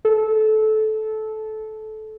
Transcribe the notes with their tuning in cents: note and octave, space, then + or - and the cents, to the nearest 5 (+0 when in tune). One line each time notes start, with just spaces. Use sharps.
A4 -20